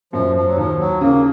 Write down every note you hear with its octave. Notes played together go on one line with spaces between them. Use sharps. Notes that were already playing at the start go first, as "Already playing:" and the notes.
F#2 F3
F3
F#3
D#2 F3
F#3
C#3 A#3